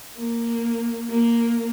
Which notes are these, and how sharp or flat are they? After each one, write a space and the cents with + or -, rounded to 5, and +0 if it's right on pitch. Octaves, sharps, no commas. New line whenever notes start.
A#3 -5
A#3 +0